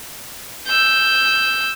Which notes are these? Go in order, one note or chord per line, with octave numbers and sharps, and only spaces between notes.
E6 G6